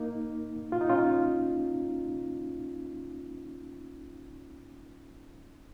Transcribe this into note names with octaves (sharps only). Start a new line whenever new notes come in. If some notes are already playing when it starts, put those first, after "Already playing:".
Already playing: A#3 D#4
F4
D#4
C#4 F4